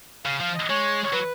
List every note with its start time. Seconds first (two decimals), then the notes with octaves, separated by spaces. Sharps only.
0.25 C#3 F5
0.40 F3 F5
0.54 D#5
0.69 G#3 C#5
1.04 C#5
1.13 F#3 B4